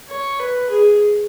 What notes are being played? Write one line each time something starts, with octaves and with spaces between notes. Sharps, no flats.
C#5
B4
G#4